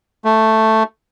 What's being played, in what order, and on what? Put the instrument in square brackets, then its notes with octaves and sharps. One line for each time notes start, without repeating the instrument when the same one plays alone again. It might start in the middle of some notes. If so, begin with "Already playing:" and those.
[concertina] A3